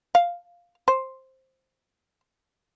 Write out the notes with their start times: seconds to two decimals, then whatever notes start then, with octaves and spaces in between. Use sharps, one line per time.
0.15 F5
0.88 C5